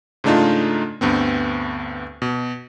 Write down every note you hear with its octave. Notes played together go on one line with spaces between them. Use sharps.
G#2 C#3 A3 D4 D#4 F4
D2 G2 B3 C4
B2